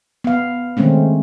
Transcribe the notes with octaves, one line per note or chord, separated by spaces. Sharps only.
B3 F5
D#3 G#3 A3 C4 C#4